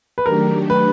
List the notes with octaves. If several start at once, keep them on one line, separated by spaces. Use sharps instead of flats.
B4
D#3 F#3 A3 D4 G4 A#4
B4